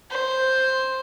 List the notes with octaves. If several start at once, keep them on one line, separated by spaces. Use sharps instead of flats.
C5